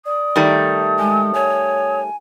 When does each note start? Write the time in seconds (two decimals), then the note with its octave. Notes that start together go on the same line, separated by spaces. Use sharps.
0.06 D5 D#6
0.36 D#3 G3 A3
0.99 G#3 G#5
1.34 C#5 G#5